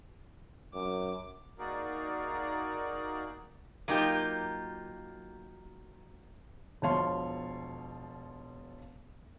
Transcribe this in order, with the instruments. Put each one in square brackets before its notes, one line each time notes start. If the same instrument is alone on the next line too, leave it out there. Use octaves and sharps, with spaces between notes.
[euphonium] F#2 [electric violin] D6
[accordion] A#3 D#4 F#4 G#4 A#4 D5
[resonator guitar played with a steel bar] F#3 A#3 D#4 F4 G4
[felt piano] E1 B2 F3 C#5 F5 C6